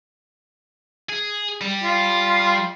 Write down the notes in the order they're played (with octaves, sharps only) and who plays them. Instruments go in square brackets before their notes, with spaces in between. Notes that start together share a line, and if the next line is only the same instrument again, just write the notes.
[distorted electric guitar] G#4
G3
[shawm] F4